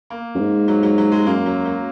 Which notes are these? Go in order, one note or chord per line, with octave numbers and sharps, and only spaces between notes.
A#3
F#2
G#2
F#3
F#3
F#3
G#3
F#2 A#3
F#3
F#3